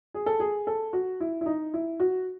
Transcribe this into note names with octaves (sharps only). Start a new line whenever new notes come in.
G#4
A4
G#4
A4
F#4
E4
E4
D#4
E4
F#4